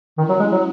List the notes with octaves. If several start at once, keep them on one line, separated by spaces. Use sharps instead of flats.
D#3 C#4 E4
F#3
G#3
F#3